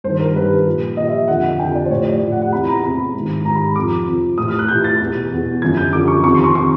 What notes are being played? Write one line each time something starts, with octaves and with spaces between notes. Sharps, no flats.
G2 D#3 C5
A#4
G2 D#3 B4
A#2 F3
A#2 F3 D#5
E5
F2 D3 F3 F#5
F2 D3 F3 G5
D5
C5
A2 F3 C#5
D5
A2 F3
F#5
F#5
E2 C3 E3 B5
A#5
E2 C3 E3 B5
G#2 D#3
G#2 D#3 A#5
B5
F2 C3 F3 D6
F2 C3 F3
A2 E3 D#6
F6
F#6
A2 E3 G6
A6
E2 B2
E2 B2
F#2 D3 F3 G#6
G6
F#2 D3 F3 D6
C#6
F2 C3 D#3 C#6
C6
C#6
C3 D#3 C#6